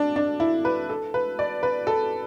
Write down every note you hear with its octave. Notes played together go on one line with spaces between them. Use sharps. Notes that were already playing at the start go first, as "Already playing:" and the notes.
Already playing: D4 A4
D4
E4
B4
A4
B4
D5
B4
A4